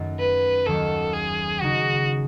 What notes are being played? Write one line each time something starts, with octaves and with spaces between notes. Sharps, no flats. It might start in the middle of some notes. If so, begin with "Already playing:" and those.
Already playing: F#2 D#3 A3
B4
D#2 D#3 F#3 A4
G#4
C#3 G#3 D#4 F#4